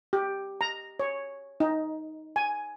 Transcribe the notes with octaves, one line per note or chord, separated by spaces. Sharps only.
G4
A#5
C#5
D#4
G#5